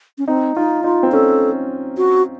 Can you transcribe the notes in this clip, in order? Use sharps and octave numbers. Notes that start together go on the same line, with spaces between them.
C#4
C4 D#4
D#4 F4
D#4 F4
C4
C#4 A4
F#4